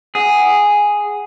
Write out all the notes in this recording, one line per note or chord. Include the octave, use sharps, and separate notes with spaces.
G#4 F#5